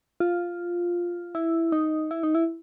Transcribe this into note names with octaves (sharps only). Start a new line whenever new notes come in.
F4
E4
D#4
E4
D#4
E4